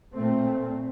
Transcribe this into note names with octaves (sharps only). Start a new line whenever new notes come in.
A#2 A3 C4